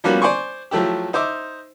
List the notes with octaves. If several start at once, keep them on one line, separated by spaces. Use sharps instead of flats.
F3 G3 A#3 B3 C#4 F#4
C5 D5 G#5 C6 C#6
F3 F#3 A3 E4 G4
D#4 C5 E5 D6